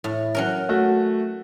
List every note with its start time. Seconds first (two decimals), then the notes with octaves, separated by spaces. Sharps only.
0.04 A2
0.35 F#3 C#4 A#4
0.69 A3 F#4